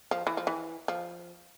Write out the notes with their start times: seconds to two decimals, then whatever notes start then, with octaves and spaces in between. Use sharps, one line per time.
0.11 F3
0.27 E3
0.37 F3
0.47 E3
0.88 F3